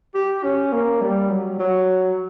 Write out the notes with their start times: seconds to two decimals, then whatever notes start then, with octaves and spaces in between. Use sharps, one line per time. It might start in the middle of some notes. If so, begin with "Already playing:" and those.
0.15 G4
0.44 C#4
0.72 A#3
1.02 G3
1.30 F#3
1.59 F#3